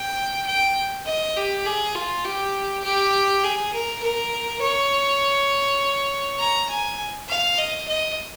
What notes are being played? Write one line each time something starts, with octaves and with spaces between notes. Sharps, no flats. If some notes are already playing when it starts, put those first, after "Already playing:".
Already playing: G5
G5
D#5
G4
G#4
F4
G4
G4
G#4
A#4
A#4
C#5
A#5
G#5
F5
D#5
D#5